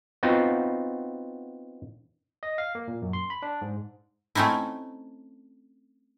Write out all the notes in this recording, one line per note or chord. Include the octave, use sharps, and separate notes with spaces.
B3 C4 D#4 F4 F#4
D#5
F5
A#3
A#2
F#2
C6
B5
D4
G#2
A3 C4 C#4 D#4 E4